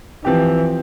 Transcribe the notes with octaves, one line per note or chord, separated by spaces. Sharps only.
E3 F3 C4 G4